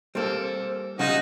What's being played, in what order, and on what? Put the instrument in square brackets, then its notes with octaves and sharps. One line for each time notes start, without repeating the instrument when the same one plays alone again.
[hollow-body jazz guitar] G3 A#3 [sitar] C4 A4
[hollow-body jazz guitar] C#3 [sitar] G3 F4 D#5 [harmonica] D#4 F#4